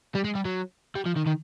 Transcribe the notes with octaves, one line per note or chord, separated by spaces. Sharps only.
G3
G#3
G3
F#3
G3
F3
D#3
D#3